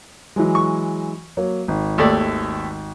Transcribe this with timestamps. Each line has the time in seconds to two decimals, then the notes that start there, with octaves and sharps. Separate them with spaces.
0.36 E3 F#3 G#3
0.55 C#6
1.37 F#3 A#3 C#5
1.68 G#1
1.98 D#2 A3 D5